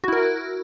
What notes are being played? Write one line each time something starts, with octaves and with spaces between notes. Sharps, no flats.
E4 F#4 A#4